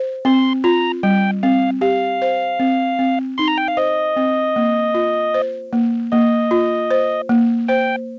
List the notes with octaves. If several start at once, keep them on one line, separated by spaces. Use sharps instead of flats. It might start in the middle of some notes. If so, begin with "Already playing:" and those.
Already playing: C5
C4 C6
F4 A#5
G3 G5
C4 F5
G4 F5
C5
C4
C4
D#4 C6
A#5
G5
F5
C5 D#5
C4
A#3
F4
C5
A#3
A#3 D#5
F4
C5
A#3
C5 G5